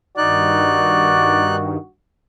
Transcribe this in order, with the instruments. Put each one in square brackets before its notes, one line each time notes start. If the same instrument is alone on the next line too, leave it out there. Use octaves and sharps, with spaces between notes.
[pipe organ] G2 D#3 [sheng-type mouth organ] D#4 F#6 [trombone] F#4 [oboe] D5